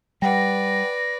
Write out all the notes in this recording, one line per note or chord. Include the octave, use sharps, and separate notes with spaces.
G3 B4 D5 F#5 G5 A#6